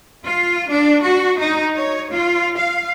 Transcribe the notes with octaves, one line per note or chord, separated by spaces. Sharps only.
F4
D4
F#4
D#4
C#5
F4
F5